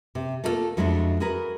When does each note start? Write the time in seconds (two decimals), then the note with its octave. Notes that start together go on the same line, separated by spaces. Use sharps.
0.15 C3
0.44 A3 A#3 E4 F4 A4
0.77 F2 F#3 G#3 A3 D4 E4
1.20 F#4 G#4 A#4 B4